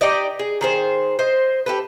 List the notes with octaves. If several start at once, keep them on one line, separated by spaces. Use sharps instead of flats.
D#4 G4 D5 D#5
G#4
D#3 G#4 C5
C5 D#5
G4 A4 B4